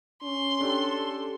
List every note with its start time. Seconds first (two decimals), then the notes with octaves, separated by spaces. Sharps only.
0.23 C#4 C6
0.61 D4 G4 A4